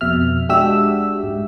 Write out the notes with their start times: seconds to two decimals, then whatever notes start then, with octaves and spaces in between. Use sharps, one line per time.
0.01 F2 B2 E5 F6
0.49 G#3 D4 F#4 G4 E5 E6
1.24 G#2